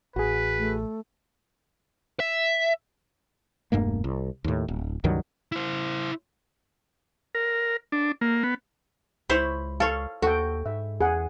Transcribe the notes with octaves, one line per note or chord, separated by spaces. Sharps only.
A1 F#4 G#4 B4
A3
E5
E1 G2 A3 A#3
C2
D#2 A2
D1
C#2 G2 D#3 F#3
E4 C5
A#4
D4
A#3
B3
C#2 E4 C5 C#5 B5
A4 C#5 F5
D#2 F#4 A4 G5
G#2 E5
E2 G#4 F#5